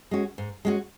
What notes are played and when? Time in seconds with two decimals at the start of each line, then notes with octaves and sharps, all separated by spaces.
0.11 G#3 C#4 F#4
0.38 G#2
0.65 G#3 C#4 F#4